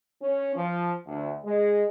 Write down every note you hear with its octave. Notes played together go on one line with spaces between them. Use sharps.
C#4
F3
D2
G#3